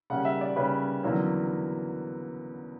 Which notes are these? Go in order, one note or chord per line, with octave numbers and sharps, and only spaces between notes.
C#3 G3 A#3 C#4 F#5
E5
D5
C#3 G3 A#3 C#4 B4
E2 D3 F#3 A#3 C#4